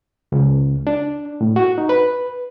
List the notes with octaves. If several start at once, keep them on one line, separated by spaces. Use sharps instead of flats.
C#2
D4
A2
F#4
D#4
B4